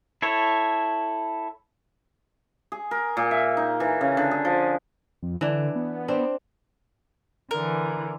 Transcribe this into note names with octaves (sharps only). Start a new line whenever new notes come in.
E4 A4 C#5
G#4
A#4
A#2
E5
D#4
E3
C#3
D3
G#4
F3
F2
D3 E3 D4
B3
C4 D4
D3 E3 A#4